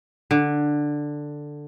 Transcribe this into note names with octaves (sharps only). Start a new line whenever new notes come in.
D3